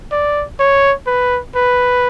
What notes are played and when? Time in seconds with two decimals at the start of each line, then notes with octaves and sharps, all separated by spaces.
0.12 D5
0.60 C#5
1.07 B4
1.55 B4